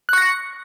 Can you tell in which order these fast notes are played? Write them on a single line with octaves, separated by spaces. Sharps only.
F#6 C#6 A#6 C#7